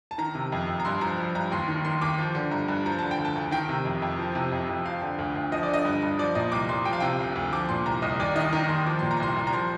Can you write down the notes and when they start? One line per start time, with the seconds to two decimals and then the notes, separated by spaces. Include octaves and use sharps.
0.11 A5
0.18 D#3 A#5
0.35 C3
0.52 F2
0.68 F2
0.80 A#5
0.85 G2 C6
1.01 F3 A#5
1.18 F3
1.35 G2 A#5
1.51 D#2 C6
1.68 D#3
1.85 D#3 C6
2.01 D#2 D6
2.18 F3
2.35 D3
2.51 G2 A#5
2.69 G2
2.86 F3 A#5
2.99 D3 A5
3.11 G5
3.18 D2
3.25 A5
3.36 D2
3.51 D#3 G5
3.69 C3
3.85 F2
4.02 F2
4.18 F3
4.35 C3
4.52 F2
4.69 F2
4.85 F3 F5
5.02 D3
5.19 D2
5.36 D2
5.52 F3 D#5
5.63 D5
5.68 D3
5.74 D#5
5.85 G2
6.03 G2
6.19 F3 D5
6.35 A#2 D#5
6.52 C2 D6
6.69 C2 C6
6.85 F3 G5
6.93 F5
7.00 C3 G5
7.19 D2
7.36 D2
7.52 F3 D6
7.69 A#2 C6
7.86 C2 A#5
8.02 C2 D#5
8.20 D#2 D5
8.35 D#3 D#5
8.53 D#3 A#5
8.69 D#2 C6
8.86 F3 D6
8.99 A#2 C6
9.11 A#5
9.20 C2 C6
9.36 C2
9.47 A#5
9.53 F3 C6